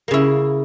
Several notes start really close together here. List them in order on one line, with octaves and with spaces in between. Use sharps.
A#3 C#3 E4